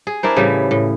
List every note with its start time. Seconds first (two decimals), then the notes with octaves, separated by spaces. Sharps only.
0.07 G#4
0.23 D4 E4 A#4 C5
0.36 A2 C#3 E3 G3
0.71 A2